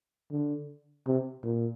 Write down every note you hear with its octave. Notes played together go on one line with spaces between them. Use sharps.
D3
C3
A#2